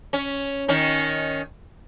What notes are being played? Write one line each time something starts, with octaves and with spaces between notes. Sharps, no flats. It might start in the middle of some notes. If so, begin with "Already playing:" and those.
C#4
D#3 C#4